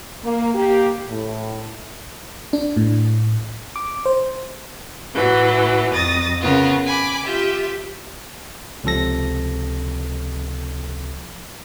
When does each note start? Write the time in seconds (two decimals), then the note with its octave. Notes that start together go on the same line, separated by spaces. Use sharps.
0.23 A#3
0.55 A#3 G4
1.08 A2
2.53 D4
2.77 A2
3.76 D6
4.06 C5
5.14 A2 E3 F#3
5.93 F2 D#6 A6 A#6
6.41 C#3 B3 F4 A#4
6.86 G#5 B5 D6
7.25 F4 G4 E5
8.84 C#2 C3 F3 A4 A#6